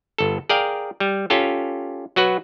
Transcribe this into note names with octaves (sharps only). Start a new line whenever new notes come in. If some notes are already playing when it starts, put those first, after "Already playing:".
G1 A4
G#4 A#4 D5 F5 G5
G3
C#4 F4 G4 A4
F#3 F#4 B4